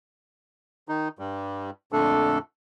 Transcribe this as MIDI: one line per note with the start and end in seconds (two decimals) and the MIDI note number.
0.89 1.08 51
0.89 1.08 63
1.19 1.70 43
1.19 1.70 55
1.92 2.38 41
1.92 2.38 46
1.92 2.38 50
1.92 2.38 57
1.92 2.38 62
1.92 2.38 69